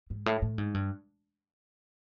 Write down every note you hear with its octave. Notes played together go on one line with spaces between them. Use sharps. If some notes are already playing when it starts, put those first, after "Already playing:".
G#2
A2
A2
G#2
G2